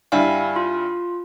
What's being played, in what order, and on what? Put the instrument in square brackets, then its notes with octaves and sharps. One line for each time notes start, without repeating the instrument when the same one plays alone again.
[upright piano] G2 G3 E4 [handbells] F5 G#5
[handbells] F4